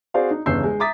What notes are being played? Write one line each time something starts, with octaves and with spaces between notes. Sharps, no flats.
C4 F#4 G#4 C5 D5 F5
D#4
G1 E2 C#3 E6 G6 C7
G#3
E5 A#5 D6 D#6 A6 B6